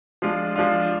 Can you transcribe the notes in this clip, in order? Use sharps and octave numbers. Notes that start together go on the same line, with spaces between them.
F3 G#3 D4 F4
F3 G#3 D4 F4